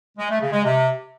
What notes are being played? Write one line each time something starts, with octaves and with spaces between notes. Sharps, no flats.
G#3
A3
C#3
G#3
C3